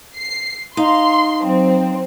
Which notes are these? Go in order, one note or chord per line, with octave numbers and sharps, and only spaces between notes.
C7
D#4 F5 C6
F#3 C4